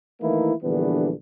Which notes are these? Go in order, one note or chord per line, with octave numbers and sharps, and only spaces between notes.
D#3 E3 A3 A#3 D#4 E4
A#1 D3 E3 G3 B3 D4